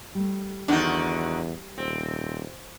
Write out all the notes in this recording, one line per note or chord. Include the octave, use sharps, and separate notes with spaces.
G3 A3
E2 D3 D#3 D4 D#4 F#4
D#1 C4